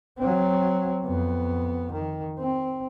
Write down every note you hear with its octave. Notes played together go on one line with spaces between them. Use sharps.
F#3 C4
F2 B3
D#3
C4